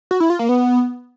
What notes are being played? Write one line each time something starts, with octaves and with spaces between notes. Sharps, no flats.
F#4
E4
F4
A#3
B3